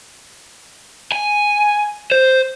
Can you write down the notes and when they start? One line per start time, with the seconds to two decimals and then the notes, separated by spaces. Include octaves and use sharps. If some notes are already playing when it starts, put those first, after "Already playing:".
1.12 G#5
2.12 C5